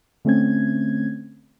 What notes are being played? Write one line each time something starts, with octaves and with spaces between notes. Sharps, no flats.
D3 A3 C4 C#4 G#6